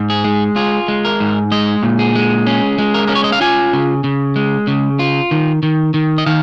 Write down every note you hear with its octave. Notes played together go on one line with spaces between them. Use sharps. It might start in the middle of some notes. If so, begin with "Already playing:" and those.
Already playing: G#2
G#4
G#3
F4 G#4
G#3
A#4
G#2
G#3 D#5
A#2
G#4
G#3
C#4 G#4
G#3
A#4
C#4 A#4
C#5
D#5
F5
F4 G#5
C#3
C#3
G#3
C#3
F4
D#3
D#3
D#3
D#5
D#3 F5